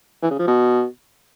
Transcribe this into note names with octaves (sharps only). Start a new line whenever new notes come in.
E3
C#3
F3
B2